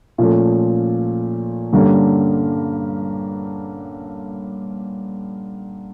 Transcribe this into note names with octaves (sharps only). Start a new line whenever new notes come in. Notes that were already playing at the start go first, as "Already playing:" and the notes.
A#2 F3 A3 C#4
G2 D3 G3 A#3 C#4